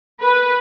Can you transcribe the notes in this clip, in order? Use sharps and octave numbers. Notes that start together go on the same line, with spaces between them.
B4